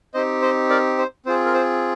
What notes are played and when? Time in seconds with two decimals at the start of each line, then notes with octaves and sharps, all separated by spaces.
0.14 C4 D#4 G4 C5 D#5
0.42 C5 D#5
0.69 A#4 D5
0.98 C5
1.26 C4 F4 G#4 C5
1.45 A#4
1.54 C5